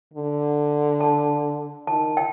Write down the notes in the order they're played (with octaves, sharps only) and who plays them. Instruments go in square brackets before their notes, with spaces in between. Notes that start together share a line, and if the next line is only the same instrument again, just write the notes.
[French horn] D3
[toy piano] A5
[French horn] D#3 [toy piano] A5
[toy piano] G5